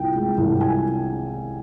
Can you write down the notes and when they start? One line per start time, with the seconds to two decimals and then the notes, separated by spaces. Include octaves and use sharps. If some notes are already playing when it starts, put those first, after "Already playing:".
Already playing: C2 A#2 G5
0.16 G#3
0.38 C2
0.61 G#5